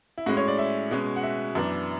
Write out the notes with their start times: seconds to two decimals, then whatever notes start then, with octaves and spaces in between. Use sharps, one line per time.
0.18 E4
0.26 A2 G#3 C#4 F#4
0.37 C#5
0.48 D5
0.59 E5
0.91 B2 G#3 C#4
1.16 F#5
1.23 E5
1.55 F#2 E3 B3 D4